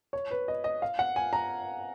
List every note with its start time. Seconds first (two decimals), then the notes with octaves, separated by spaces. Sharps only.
0.13 C#5
0.31 B4
0.48 D#5
0.64 D#5
0.82 F5
0.99 F#5
1.16 G#5
1.33 A#5